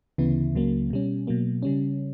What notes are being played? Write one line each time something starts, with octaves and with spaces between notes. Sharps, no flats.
D2 C#3 E3 B3 E4
C#2 C#3 F#3 A#3
B2 G3 C#4
B2 F#3 A#3
C#3 G3 C#4